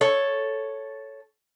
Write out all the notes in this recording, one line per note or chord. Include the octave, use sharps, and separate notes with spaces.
A4 C#5